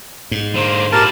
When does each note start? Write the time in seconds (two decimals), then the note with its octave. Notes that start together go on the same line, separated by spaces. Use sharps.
0.31 G#2
0.55 D3 A#3 C5
0.93 A#2 E4 G4 A#4 A5